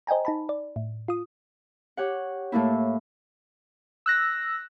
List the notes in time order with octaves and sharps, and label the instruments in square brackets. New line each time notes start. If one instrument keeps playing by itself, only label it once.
[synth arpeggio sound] C5 D#5 G5 G#5 A#5
D#4 A5 B5
D5
A2
F4 D#6
[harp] G4 C#5 F#5
A2 A3 A#3 E4
[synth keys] E6 F#6 A#6